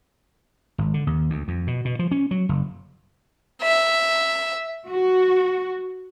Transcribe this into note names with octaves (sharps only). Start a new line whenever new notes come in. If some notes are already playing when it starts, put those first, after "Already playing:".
G#1
D3
D#2
D2
F2
B2
B2
F3
C#4
F#3
F#1
E5
F#4